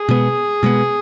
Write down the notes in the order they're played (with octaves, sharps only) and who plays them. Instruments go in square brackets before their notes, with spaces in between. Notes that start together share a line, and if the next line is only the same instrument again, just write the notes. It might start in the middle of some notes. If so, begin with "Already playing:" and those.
Already playing: [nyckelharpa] G#4
[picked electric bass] B2 G#3 B3
B2 G#3 B3